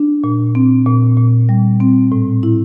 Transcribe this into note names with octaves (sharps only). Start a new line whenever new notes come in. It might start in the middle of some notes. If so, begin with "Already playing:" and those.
Already playing: D4
A#2
C4
A#2
A#2
G3
C4
A2
E4